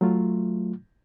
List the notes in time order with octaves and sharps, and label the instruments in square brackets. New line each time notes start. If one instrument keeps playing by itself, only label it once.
[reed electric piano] F#3 A3 F4